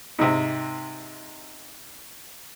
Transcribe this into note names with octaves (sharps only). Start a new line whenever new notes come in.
G#2 C3